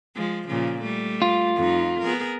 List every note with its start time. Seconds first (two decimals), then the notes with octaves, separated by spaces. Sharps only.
0.15 F3 G#3
0.48 A#2 C#3 F3
0.82 G3 A3
1.22 F4
1.55 F2 D#4
2.02 B3 G#4 A#4